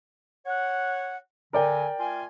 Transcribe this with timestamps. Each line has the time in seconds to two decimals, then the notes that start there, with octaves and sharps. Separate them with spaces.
0.46 C#5 F#5
1.53 D3 A#4 D5 G5 G#5
2.00 A3 F4 G#5